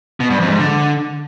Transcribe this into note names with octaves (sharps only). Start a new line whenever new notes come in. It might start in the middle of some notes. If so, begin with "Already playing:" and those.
B2
G2
F2
G#2
D3